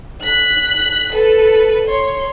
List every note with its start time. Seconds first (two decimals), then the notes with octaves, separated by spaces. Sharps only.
0.21 F#6 B6
1.12 A4 B4
1.86 C#5 C6